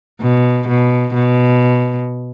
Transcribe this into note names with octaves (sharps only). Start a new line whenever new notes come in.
B2
B2
B2